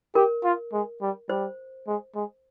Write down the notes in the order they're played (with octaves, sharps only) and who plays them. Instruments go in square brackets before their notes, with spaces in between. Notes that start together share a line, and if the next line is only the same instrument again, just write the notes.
[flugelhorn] G4 [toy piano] A#4
[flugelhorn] F4
G#3
G3
[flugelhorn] G3 [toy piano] C5
[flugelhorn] G#3
G#3